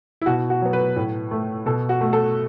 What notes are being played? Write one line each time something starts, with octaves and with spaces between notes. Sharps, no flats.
E4
B2 F#4
F#4
F#3 B3
B4
A2
A3
B2 A4
F#4
A3
A4